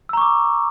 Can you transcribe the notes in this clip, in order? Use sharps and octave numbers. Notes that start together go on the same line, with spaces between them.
A#5 C#6 D6 E6